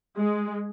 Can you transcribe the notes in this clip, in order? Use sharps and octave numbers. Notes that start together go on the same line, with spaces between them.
G#3